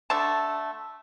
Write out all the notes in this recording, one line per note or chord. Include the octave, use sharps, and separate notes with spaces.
D3 A3 A5